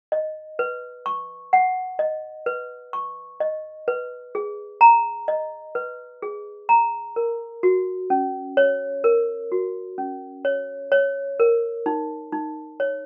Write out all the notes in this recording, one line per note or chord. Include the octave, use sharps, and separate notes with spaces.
D#5
B4
C#6
F#5
D#5
B4
C#6
D#5
B4
G#4
A#5
D#5
B4
G#4
A#5
A#4
F#4
C#4
C#5
A#4
F#4
C#4
C#5
C#5
A#4
D#4
D#4
C#5